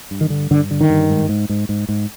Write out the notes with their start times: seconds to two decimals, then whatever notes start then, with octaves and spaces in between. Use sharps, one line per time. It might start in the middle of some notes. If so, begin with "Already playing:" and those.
0.11 G2
0.21 D#3
0.30 D3
0.50 G2 D3
0.71 D3
0.81 D#3
0.90 G2
1.10 G#2
1.29 G#2
1.49 G#2
1.69 G#2
1.89 G#2